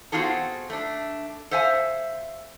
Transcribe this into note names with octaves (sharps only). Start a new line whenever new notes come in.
B3 C4 F4 F#4 G#4 A4
A3 D4
A4 C5 E5 F5 G#5